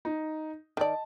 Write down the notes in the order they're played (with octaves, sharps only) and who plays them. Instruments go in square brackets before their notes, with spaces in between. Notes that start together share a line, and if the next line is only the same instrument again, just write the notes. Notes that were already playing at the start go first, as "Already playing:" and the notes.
[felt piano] D#4
[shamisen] D#3 D5 [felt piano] D#5 A5